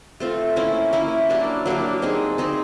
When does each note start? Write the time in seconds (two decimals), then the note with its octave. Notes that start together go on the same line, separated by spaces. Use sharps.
0.20 A3 C4 F4
0.56 A#3 C#4 E4
0.93 A#3 C#4 E4
1.29 F#3 A#3 D4 G4
1.66 F#3 A#3 D4 G4
2.02 C4 D#4 G#4
2.38 C4 D#4 G#4